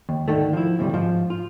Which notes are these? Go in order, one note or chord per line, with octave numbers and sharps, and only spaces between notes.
D#2
G#2 D3 D#3 A3
F3 E4
D2 A2 C3 F3 G3
G#2 F3
F4